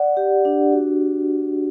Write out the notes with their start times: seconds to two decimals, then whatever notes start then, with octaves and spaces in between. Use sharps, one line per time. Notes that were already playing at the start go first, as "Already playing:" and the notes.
Already playing: D5 F#5
0.17 G4
0.45 D4
0.73 F#4